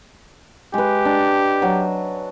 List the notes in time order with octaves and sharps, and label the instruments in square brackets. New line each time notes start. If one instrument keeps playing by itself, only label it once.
[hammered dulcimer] G#3 B4 [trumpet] G4
[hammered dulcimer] D4
F#3